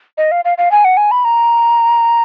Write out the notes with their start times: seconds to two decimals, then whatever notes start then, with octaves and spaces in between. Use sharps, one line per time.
0.18 D#5
0.31 F5
0.45 F5
0.58 F5
0.71 G#5
0.84 F#5
0.97 G#5
1.11 B5
1.25 A#5